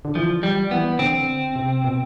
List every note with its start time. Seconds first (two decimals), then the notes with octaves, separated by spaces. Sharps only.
0.05 D3
0.15 E3 F3
0.43 F3 G3
0.71 E3 B3
0.99 D3 C4
1.56 C3
1.84 B2